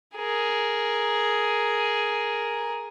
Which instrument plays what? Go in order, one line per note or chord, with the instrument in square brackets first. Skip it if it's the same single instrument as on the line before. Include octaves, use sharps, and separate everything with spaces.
[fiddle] G#4 A#4